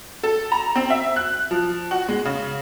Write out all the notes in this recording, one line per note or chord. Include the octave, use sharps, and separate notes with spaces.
A4
A#5
C4
E5
F#6
F3
F#4
G#3
C#3